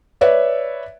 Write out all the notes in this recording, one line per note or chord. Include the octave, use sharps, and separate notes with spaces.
B4 C#5 D5 E5